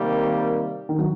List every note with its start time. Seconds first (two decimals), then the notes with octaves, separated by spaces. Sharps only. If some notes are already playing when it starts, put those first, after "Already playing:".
Already playing: C3 D#3 G3 A#3
0.89 D#3
0.99 F#3